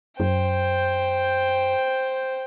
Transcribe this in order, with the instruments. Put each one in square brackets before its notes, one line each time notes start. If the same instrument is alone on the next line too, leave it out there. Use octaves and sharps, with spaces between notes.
[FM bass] F#2 [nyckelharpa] C5 [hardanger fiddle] G5